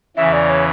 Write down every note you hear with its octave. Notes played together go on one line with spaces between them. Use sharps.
E2 C#3 E3 E5
D5
C#5